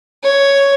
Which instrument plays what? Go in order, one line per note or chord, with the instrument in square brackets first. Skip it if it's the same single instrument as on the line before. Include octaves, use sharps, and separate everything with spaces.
[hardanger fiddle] C#5